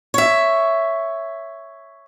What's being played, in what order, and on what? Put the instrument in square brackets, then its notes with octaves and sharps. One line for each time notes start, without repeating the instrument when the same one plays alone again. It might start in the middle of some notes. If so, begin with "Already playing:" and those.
[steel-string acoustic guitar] C#5 E5